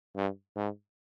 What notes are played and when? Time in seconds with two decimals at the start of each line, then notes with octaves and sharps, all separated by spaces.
0.16 G2
0.56 G#2